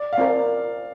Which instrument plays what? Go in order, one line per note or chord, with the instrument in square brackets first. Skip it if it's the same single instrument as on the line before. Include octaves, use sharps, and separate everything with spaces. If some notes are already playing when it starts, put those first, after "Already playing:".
Already playing: [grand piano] D5
F5
[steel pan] C4 F4 A#4 [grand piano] D5